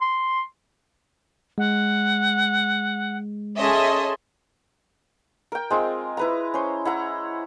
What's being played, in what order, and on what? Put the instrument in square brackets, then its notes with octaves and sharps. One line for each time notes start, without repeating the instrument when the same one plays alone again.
[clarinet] C6
[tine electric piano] G#3 [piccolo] F#5
[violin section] C#4 D#5 E5 [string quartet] G#4 A4 C6
[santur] A#4 G5
G#3 C4 F4
E4 B4 A#5
C#4 C5
E4 F#5 A#5